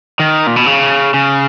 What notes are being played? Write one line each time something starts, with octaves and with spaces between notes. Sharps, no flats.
D#3
A#2
B2
C#3
C#3